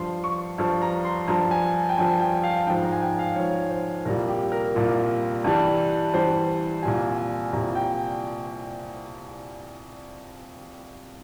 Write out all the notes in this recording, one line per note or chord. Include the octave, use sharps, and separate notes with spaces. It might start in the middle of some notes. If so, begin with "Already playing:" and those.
Already playing: G2 F3 C6
C#6
G2 F3
A#5
C6
G2 F3 A#5
G#5
G5
G2 F3 G#5
G5
F5
G#2 F3 G5
A#5
G#5
G5
F5
G#2 F3 C#5
C5
C2 A#2 G3 A#4
G4
A#4
C2 A#2 G3
G2 E3 G3
G2 E3 G3 C5
C2 A#2 G3 G#5
G#5
C2 A#2 G3 A#5
G5